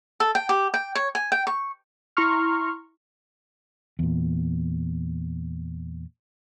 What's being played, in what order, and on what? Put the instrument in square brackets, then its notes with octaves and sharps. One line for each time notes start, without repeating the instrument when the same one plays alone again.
[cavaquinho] A4
G5
G4
G5
C#5
G#5
G5
C#6
[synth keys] E4 A#5 C6 C#6 F6
[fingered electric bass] E2 A#2